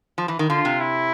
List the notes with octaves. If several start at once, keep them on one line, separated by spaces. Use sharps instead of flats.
F3
E3
D#3
D3 F4
C3
E4